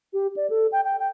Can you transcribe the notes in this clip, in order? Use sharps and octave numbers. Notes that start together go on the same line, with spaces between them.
G4
D5
A4
G5
G5
G5